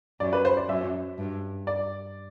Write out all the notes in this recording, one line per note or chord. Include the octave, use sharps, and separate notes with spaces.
F#2 D5
B4
C5
D5
F#2 E5
G2
D5